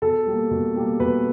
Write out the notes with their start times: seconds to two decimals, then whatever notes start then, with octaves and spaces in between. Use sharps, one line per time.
0.02 B2 A4
0.27 G3 A#3
0.51 B2
0.76 G3 A#3
1.00 B2 B4